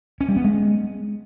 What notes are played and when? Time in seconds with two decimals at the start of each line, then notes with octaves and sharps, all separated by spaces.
0.21 C#4
0.29 G3
0.36 B3
0.44 G#3